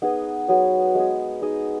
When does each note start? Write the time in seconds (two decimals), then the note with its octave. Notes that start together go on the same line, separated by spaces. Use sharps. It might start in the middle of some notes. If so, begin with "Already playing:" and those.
0.02 B3 D#4 G#4 D#5
0.48 F#3 B3 G#4
0.95 G#3 B3 G#4
1.42 D#4 G#4 D#5